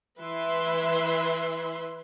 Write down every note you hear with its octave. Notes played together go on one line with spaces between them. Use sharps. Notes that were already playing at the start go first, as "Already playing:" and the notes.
E3 E4 B4 E5 C6